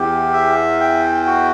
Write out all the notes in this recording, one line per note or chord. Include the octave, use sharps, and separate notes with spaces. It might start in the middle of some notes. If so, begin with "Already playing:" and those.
Already playing: E2 G4
E5
G5
F#4